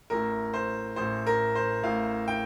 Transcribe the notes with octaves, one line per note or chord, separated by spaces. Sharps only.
A1 A2 A#4
C5
A1 A2 C5
A#4
C5
A1 A2 F5
G5